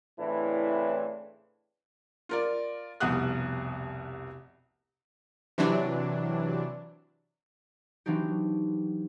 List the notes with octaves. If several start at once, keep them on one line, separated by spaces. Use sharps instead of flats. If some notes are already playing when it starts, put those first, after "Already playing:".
A2 C#3 E3 C4 D4 E4
F4 A#4 D5
F1 C2 B2 F#5 D#6 F#6
C3 E3 F#3 D4
E3 F#3 C4 D4 D#4 G4